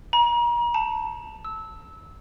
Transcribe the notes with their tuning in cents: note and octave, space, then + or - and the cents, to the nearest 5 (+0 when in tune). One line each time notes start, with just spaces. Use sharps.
A#5 +35
A5 +5
E6 -20